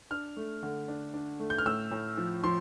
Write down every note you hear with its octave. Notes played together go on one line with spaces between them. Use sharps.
D4 F6
A3
D3
D4
D4
A3
G6
F6
A2 E6
A2
F3
F3 C6